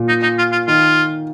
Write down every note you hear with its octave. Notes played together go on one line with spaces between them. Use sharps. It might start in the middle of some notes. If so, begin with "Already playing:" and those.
Already playing: A#2
D#4
D#4
F4
F4
D#3 F4